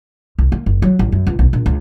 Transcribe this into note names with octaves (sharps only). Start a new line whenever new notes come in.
C2
A#3
F#1
F#3
A1
F#2
C#2
B1
A#1
C#2